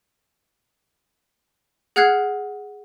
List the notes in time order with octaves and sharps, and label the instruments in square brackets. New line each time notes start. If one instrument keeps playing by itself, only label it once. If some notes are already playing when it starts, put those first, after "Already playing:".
[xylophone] G#4 F#5 F6 F#6 G#6 C7